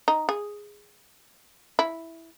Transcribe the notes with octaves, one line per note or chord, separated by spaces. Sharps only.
D#4
G#4
E4